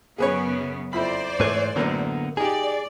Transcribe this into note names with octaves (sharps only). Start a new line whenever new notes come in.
F#2 C#3 B3 G#4 B4 C#5
F2 E4 C5 D5 B5
G#2 E3 A3 B4 C#5
F#2 A2 D3 A#3 B3
D#4 G4 G#4 D5